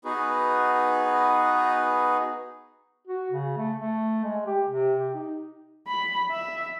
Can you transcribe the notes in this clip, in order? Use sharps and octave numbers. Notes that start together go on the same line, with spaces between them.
B3 D#4 F#4 G#4 B4
F#4
C#3
A3
A3
G#3
G4
C3
G4
D#4
B5
E5